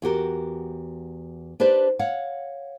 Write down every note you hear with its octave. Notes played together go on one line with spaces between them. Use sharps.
E2 F#4 G4 A#4
D4 G4 B4 C5 D5
C#5 F5 F#5